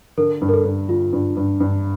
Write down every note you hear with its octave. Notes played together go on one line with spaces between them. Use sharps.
D3 A#4
G2
A#4
A4
G2
D3 F4
G2
G2
G2